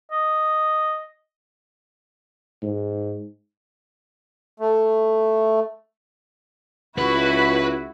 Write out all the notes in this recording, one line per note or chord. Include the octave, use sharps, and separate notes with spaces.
D#5
G#2
A3
C#2 E4 F#4 B4 B5